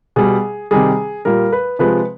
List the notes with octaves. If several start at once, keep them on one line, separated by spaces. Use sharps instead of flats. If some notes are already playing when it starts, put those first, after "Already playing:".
B2 G3 G#4
C3 D#3 G3 G#4
A#2 G3 A#4
B4
C3 F3 G#3 B4